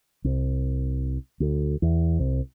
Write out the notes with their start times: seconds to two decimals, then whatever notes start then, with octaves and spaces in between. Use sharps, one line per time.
0.24 C2
1.40 D2
1.82 E2
2.19 C2